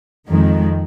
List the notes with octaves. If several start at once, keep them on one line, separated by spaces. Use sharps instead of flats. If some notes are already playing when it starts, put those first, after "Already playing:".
F2 D#3 G#3